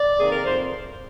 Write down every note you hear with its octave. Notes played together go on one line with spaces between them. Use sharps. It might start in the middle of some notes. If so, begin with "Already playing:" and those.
Already playing: D5
C3 D#3 A#3 G#4
A#4
F2 C5